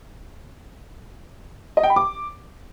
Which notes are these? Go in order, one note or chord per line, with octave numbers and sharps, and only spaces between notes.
D#5
G5
B5
D6